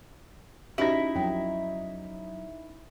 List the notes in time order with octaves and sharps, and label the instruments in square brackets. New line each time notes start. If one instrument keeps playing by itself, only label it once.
[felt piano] C#4 D#4 A#6 [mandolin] E4 [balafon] F#4 G4 B5
[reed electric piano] F2 F#3 [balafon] G5